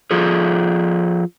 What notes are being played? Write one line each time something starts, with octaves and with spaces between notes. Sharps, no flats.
F3 F4 G#4 A4